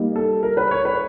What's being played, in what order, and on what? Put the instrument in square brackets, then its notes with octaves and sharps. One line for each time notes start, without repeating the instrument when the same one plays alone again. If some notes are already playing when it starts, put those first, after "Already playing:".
Already playing: [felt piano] G3 A#3 D#4
[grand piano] A4
A#4
B4
C#5
B4